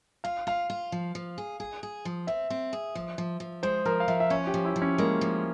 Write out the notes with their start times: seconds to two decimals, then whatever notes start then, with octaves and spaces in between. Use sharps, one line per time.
0.24 F4 F5
0.47 F4 F5
0.70 F4
0.92 F3
1.15 F3
1.38 G#4
1.60 G#4
1.83 G#4
2.05 F3
2.27 C4 E5
2.50 C4
2.73 G#4
2.95 F3
3.18 F3
3.40 F3
3.63 G#3 C5
3.85 F3 A#4
4.00 F5
4.08 F3 E5
4.20 E5
4.30 C#4 C#5
4.47 G4
4.54 F3
4.65 E4
4.76 F3
4.82 C#4
4.98 G#3 A#3
5.21 F3